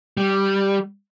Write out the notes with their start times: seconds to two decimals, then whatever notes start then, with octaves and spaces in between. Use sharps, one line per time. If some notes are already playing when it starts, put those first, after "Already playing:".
0.17 G3